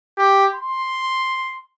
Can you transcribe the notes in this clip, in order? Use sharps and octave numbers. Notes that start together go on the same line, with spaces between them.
G4
C6